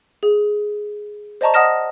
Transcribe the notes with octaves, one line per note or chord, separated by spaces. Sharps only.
G#4
C5 D5 D#5 A5 A#5 C#6
D#5 F#5 D#6 F6 A#6 E7